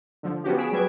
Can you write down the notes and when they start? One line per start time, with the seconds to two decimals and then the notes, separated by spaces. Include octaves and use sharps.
0.23 D3 F3
0.44 F3 B3 C#4 F#4 G4
0.57 B3 C#4 G#4 B6 D7 E7
0.72 F#3 G3 G#4 B4 G#6